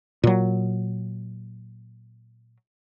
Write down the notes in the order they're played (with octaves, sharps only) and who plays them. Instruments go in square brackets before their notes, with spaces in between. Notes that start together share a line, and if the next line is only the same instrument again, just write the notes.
[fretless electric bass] A#2 F#3